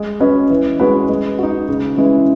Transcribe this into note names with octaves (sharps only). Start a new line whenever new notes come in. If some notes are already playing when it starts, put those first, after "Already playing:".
Already playing: G#3
C#4 F#4 B4 D#5
E3
G#3 C#4 F#4 B4
G#3
D#4 F#4
C#3
E3 G#3 C#4 E4